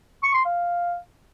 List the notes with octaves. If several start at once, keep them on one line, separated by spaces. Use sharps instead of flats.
C#6
C6
F5